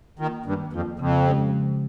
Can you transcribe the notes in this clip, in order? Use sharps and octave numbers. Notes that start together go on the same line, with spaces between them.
D#3 A#3 F4
G2 D#3
F2 A#3 F4
F2 C#3
F3 G#3 C#4 G4
C#3